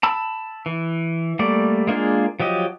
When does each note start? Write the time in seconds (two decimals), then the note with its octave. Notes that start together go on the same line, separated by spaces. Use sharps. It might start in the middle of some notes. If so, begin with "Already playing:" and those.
0.03 A5 B5 E6
0.66 E3
1.39 G3 A3 A#3 D5
1.87 G#3 A#3 D4 F4 G#4
2.40 F3 F#3 G4 D#5